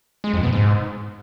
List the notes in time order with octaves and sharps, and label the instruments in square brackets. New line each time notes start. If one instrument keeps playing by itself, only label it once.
[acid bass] G#3
F2
B2
G#2